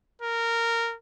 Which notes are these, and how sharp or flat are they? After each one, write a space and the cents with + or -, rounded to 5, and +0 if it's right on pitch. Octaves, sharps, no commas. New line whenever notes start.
A#4 -15